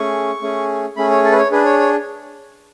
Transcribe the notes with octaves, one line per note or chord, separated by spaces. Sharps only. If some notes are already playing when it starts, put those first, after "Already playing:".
Already playing: A3 C#4 G#4 C#6
A3 C#4 G#4
A3 C#4 G#4 B5
C#5
A4
B4
C#5
D4 G#4 B4
C#5
C#5